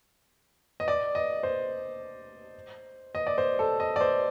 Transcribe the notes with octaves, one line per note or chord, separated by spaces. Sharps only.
D#5
D5
D#5
C5
D#5
D5
C5
A4
D#5
D5
C5